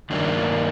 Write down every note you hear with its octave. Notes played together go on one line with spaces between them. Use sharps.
G2 D#3 F#3 A#3 D4